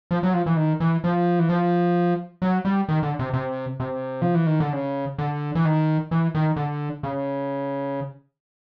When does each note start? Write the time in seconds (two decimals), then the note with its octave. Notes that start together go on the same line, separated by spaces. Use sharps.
0.11 F3
0.23 F#3
0.34 F3
0.46 E3
0.57 D#3
0.80 E3
1.04 F3
1.39 E3
1.49 F3
2.42 F#3
2.65 G3
2.89 D#3
3.03 D3
3.19 C3
3.33 C3
3.80 C3
4.22 F3
4.35 E3
4.47 D#3
4.60 D3
4.73 C#3
5.18 D3
5.55 E3
5.65 D#3
6.11 E3
6.35 D#3
6.56 D3
7.03 C#3